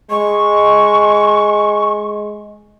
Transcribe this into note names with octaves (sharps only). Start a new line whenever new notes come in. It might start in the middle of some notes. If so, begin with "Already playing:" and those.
G#3 C#6